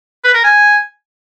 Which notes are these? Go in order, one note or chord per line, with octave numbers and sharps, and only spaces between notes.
B4
A#4
G#5